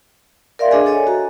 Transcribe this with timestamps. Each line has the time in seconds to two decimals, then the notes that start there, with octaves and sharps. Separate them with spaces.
0.59 A#4 D5 E5 F5 C6
0.71 D4 G#4 D#5 F5 G#5
0.86 A4 C#5 D#5 G#5
1.07 F#4 A#5